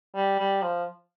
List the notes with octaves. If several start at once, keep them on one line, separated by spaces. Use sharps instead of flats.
G3
G3
F3